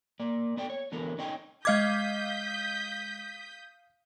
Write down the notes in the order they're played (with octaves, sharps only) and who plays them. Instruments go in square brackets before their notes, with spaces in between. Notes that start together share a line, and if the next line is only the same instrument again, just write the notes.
[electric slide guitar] A#3 D5
B3 D5 G5
C#5
D3 E3 B3 A#4
C#4 D#4 C#5 G5
[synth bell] G#3 D#5 D6 [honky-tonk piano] F5 G#6 [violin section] D#6 G6 B6